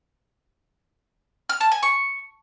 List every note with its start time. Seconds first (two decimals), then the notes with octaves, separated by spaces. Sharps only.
1.49 F6
1.61 A5
1.72 G#5
1.83 C#6